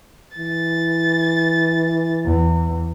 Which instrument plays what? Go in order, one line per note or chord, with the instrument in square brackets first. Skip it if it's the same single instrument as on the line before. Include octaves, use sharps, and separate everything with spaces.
[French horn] E3 [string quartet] A6
[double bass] E2